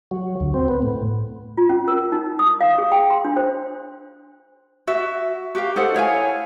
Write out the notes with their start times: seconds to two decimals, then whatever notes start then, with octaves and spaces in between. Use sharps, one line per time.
0.11 F#3
0.40 D2
0.54 C4
0.68 B3
0.82 A2
1.57 F4
1.69 C#4
1.88 A#4
2.12 D#4
2.39 D#6
2.61 F5
2.78 G#4
2.92 G5
3.10 C6
3.25 D4
3.37 C5
4.87 F#4 E5
5.55 F#4 G4 A#4 F5
5.76 D#4 A4 C5 F#5
5.94 E4 C#5 F5 G#5